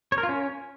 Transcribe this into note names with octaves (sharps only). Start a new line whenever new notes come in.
C#5
A#4
F4
C#4